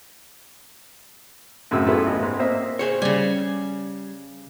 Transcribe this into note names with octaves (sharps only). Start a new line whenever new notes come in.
F#2 A2 C#3 C4 F#4 E6
A3 B3 E4 F4 G#4 B4
A1 D#5
G#2
A#3 C4 C5 D#5 E5
G#4 C5 C#5
C#3 G3 G#5